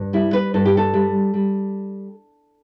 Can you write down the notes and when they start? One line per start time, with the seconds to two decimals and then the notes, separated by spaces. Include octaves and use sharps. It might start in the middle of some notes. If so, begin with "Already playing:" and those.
Already playing: G2
0.13 G3 E4
0.33 B4
0.54 G2 A4
0.65 G4
0.77 A4
0.94 G3
1.34 G3